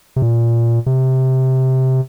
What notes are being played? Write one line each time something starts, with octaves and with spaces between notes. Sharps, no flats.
C3
A#2
C3